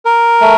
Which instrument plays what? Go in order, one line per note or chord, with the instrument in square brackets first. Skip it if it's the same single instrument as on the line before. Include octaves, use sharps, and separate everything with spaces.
[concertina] A#4
A3